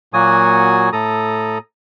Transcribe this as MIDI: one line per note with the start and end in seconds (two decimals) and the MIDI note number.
0.14 0.90 46
0.14 0.90 54
0.14 0.90 58
0.14 0.90 66
0.14 0.90 80
0.14 0.90 87
0.93 1.58 45
0.93 1.58 69
0.93 1.58 82
0.93 1.58 87